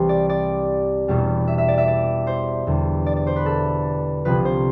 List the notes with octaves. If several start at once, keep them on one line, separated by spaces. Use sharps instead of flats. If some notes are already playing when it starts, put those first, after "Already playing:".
Already playing: C2 C3 E3 G3 C5
D5
D5
E1 E2 B2 G3
E5
E5
D5
E5
D5
C5
E2 D3 G3
D5
D5
C5
B4
A4
C2 C3 F3 B4
C5